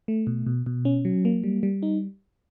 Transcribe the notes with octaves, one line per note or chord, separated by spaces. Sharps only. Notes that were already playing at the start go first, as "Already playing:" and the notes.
A3
B2
B2
B2
C#4
F#3
A#3
G3
G3
D#4